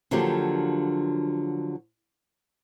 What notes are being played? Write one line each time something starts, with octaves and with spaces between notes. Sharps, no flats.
D3 F3 F#3 A#3 D4 G4